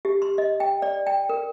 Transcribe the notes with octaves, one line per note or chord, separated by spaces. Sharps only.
G4
C6
D#5
G5
D5
G5
A#4